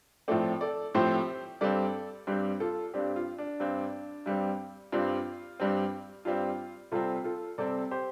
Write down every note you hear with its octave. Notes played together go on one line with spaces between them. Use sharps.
A2 F3 A3 C4 A4 D5
A4 D5
A2 F3 A3 C4 G4 C5
G2 G3 C4 A4 D5
G2 G3 C4 G4 C5
F4 A4
G2 G3 C4 D4 G4
F4
D4
G2 G3 C4
G2 G3 C4
G2 G3 C4 F4
G2 G3 C4
G2 G3 C4 F4
C3 G3 C4 F4 A4
F4 A4
C3 G3 C4 A4 D5
G4 C5